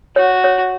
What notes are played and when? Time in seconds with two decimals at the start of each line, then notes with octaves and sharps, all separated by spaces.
0.16 F#4 C#5
0.44 C#5